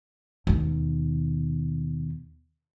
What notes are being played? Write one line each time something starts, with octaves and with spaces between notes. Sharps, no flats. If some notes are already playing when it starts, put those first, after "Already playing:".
D#2 B2